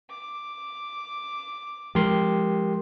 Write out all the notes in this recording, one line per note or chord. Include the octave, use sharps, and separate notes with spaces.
D6
F3 G#3 G4 A#4 C6